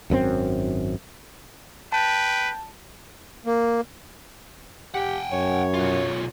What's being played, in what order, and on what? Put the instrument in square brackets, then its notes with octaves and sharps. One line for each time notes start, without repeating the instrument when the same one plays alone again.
[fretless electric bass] G#1 F#2 A2 C4
[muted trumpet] B4 [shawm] G5 [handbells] A5
[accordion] A#3
[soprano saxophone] G4 [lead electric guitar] F#5 G5
[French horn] F#2 [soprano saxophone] C#5
[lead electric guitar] B1 F4